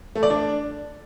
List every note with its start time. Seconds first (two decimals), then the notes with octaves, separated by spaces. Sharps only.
0.15 A3
0.23 D5
0.30 D4